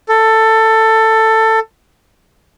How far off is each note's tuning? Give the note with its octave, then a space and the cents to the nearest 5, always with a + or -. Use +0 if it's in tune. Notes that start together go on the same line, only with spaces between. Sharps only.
A4 +15